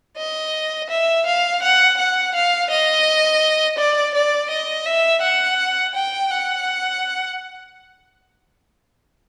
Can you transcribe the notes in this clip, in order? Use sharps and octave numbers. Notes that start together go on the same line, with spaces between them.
D#5
E5
F5
F#5
F#5
F5
D#5
D5
D5
D#5
E5
F#5
G5
F#5